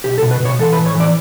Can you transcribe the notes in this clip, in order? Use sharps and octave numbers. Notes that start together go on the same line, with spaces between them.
B1 G4
A4
B2
B4
B2
C#5
E3 A4
B4
A2
C#5
E3
D5